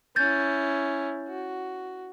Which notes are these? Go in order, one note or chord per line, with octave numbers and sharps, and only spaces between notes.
C#4 E4 G6 A6
F#4